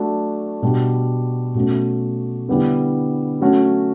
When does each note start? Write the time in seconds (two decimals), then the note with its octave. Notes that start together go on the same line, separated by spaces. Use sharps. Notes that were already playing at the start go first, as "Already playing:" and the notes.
Already playing: F#3 A3 D4 F#4
0.62 B2 G3 D4 F#4
1.55 B2 F#3 A3 C#4 F#4
2.48 D3 G3 B3 E4
3.41 F#3 A3 C#4 F#4